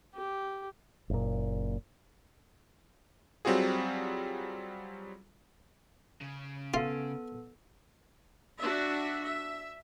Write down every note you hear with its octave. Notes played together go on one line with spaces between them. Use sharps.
G4
F#1 A#2
F#3 G3 C4 F4 F#4 G#4
C#3
B3 F4 A4
D4 F#4 E5
E5